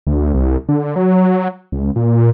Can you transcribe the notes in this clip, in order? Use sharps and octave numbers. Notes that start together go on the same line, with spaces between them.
D2
C2
D3
F#3
C#2
A#2